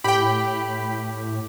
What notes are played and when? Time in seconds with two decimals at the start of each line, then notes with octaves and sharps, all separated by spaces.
0.04 A2 G4 G5 B5